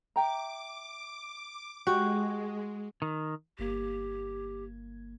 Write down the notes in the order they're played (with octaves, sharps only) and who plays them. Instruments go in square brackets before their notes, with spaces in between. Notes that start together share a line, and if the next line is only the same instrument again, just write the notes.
[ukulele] E5 G5 A#5 [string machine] D6
[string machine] G#3 [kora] F#4 [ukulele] G4
[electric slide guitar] D#3
[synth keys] G1 A#3 G#6 [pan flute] G4